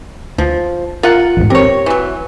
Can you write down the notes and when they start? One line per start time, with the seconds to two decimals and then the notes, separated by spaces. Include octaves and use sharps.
0.38 D2 F3
1.03 F4 A#4 F#5
1.37 A1 E2 G#2
1.50 C4 G4 A#4 C#5
1.86 E3 F#3